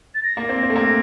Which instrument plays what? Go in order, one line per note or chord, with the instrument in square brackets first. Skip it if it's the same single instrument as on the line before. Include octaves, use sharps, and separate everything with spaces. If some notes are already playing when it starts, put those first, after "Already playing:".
[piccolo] A6
A#6
[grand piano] A#3
C4
C4
A3
A#3